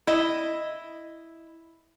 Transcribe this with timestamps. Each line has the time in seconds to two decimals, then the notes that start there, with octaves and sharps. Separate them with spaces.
0.07 E4 D#5